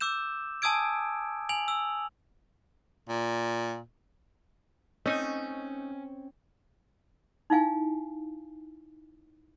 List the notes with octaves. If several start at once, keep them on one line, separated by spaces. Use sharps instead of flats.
D6 E6 G6 E7
G#5 A5 D#6 E6 G#6 D7
G#5 F7 F#7
E6
A#2
A3 C4 C#4 D#4 D#5 G#5
D#4 E4 F5 G#5